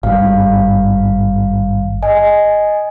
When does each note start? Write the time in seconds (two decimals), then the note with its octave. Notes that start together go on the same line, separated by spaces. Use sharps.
0.03 G#1 G2 F5
2.03 D#5 G#5